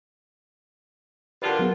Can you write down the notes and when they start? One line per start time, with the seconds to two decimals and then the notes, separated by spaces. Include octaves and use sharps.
1.42 D3 G3 F4 F#4 A#4 B4 F#5 A5
1.59 F#3 B3 G#4